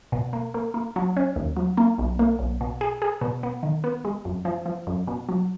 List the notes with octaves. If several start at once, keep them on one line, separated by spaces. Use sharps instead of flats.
B2
A#3
A#3
A#3
F#3
C#4
D#2
F#3
A#3
B1
A#3
B1
B2
G#4
G#4
B2
B3
D#3
B3
G#3
F#2
F3
F3
F#2
B2
F#3